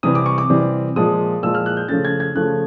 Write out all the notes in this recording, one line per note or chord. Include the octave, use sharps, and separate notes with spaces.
C3 E3 G3 C4 D#6
D6
C#6
D6
C3 E3 G3 C4
A#2 F3 G#3 D#6
A#2 F3 G#3 E6
F6
F#6
G6
C#3 F3 A3 C#4 A6
G#6
G#6
C#3 F3 A3 C#4 F#6